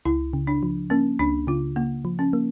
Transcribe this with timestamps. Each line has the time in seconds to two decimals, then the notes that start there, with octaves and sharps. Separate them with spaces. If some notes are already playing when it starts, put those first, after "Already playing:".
0.05 C#2 E4
0.33 C#3
0.47 D4
0.63 F3
0.90 A#3 C#4
1.19 C#2 D4
1.47 C#3 F4
1.76 C#3 A#3
2.05 F3
2.19 C#4
2.33 A#3